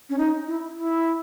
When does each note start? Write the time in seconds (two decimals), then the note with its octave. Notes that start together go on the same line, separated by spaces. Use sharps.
0.09 C#4
0.18 D#4
0.47 E4
0.76 E4